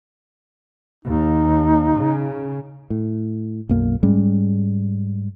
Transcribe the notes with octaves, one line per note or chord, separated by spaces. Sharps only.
D#2 D#4
C#3
A2
B1 F#2 A#3
G#2 G3 G#3 C#4